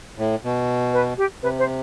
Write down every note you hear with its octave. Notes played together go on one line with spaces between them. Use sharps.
A2
B2
B4
G4
C3 B4
C5